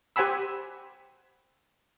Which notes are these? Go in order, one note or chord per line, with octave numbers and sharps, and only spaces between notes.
G4 C5 F#5 G#5 B5 E6